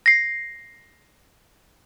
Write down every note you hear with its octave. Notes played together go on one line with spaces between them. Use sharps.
A#6 C7